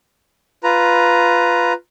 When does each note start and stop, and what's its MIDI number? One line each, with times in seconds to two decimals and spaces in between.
0.64 1.73 65
0.64 1.73 71
0.64 1.73 82